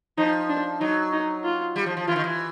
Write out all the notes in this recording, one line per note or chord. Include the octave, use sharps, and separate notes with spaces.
F3 D#4
D4
F#3 D#4
D#4
F4
G3
F3
F3
E3 F4
D#3
E3